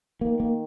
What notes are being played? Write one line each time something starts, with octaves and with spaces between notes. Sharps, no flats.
D#3 A#3
A#3